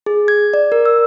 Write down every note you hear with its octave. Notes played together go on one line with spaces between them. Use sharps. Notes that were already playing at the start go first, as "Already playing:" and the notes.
G#4
G#6
D5
A#4
E6